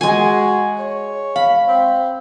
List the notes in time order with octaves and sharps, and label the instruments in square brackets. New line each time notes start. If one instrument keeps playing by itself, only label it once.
[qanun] G#3 G#5 [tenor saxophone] F#4
[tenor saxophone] C#5
[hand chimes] F5 [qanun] B5
[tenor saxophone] C4